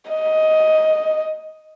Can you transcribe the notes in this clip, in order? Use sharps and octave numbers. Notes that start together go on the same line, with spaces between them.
D#5